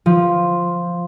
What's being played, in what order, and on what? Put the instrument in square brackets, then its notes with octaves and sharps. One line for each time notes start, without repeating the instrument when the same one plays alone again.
[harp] F3